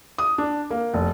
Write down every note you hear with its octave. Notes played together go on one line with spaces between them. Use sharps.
D#6
D4
A#3
F1